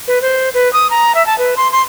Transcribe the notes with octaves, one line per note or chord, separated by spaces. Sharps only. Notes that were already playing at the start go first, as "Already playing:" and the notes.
B4
C5
B4
D#6
A#5
E5
A5
B4
C6
C6